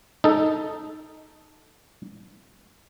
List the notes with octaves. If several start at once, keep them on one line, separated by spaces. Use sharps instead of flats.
D#4 A4